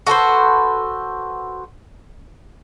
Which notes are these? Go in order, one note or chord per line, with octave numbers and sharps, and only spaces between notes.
F#4 A4 B4 C5